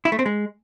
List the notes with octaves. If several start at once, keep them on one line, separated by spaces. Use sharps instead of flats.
E4
A3
C4
G#3